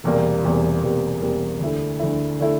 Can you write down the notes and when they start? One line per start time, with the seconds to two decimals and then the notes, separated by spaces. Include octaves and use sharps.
0.04 E1 E2 C3 G3 A#3
0.44 E1 E2 C3 G3 A#3
0.83 E1 E2 C3 G3 A#3
1.22 E1 E2 C3 G3 A#3
1.60 D2 D3 A3 E4
2.00 D2 D3 A3 E4
2.40 D3 A3 E4